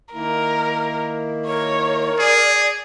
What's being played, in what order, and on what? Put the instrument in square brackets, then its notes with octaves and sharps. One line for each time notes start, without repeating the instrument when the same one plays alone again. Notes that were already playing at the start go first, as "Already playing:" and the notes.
[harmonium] D#3 A#3 E4 [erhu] A#4
[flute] A#4 [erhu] C#5
[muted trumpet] G#4 [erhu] D5